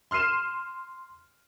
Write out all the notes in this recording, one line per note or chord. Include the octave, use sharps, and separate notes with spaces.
C6 F6 C7 D#7 E7